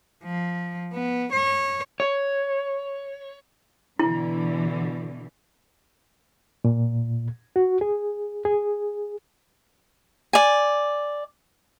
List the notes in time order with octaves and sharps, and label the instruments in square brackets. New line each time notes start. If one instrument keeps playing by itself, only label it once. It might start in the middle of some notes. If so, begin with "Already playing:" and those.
[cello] F3
B3
C#5
[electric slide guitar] C#5
[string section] B2 D3 E3 [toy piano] E4
[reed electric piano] A#2
F#4
G#4
G#4
[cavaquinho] D5 G#5